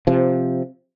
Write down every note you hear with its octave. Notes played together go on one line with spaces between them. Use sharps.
C3 F3